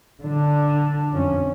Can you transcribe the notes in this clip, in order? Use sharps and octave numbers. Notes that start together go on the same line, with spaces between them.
D3 D4
F2 C#4